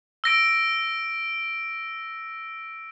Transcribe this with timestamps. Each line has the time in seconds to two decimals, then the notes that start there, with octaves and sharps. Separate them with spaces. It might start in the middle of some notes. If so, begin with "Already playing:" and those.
0.24 E6 A#6 D7